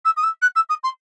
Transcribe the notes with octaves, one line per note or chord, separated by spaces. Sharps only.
E6
D#6
E6
F#6
E6
D#6
C6